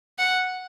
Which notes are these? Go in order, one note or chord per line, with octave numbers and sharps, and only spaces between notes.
F#5